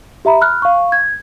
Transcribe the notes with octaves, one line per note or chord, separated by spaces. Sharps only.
G4 E5 A#5 B5
B5 F6 F#6
F5 C#6
G#6